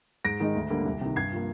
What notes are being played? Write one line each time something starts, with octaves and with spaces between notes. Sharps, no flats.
G#2 A#6 D7
D#3 G#3 D#4
D2
D3 G3 A#3
C2
C3 D#3
G2 G#6 C7
F3 A#3